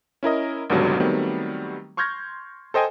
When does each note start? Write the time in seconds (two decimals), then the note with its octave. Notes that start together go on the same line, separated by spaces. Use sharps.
0.23 C#4 E4 A#4 D#5
0.70 G#1 C#2 B2 D3 F#3 G3
1.00 D#3 F#3 G3 A3 B3 C4
1.97 C6 C#6 F6 G6 G#6 A#6
2.74 A4 C5 D#5 G5 G#5